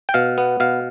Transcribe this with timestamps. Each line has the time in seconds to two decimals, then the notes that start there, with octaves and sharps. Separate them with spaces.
0.09 G5
0.14 B2 F5
0.38 B3
0.60 B2 F5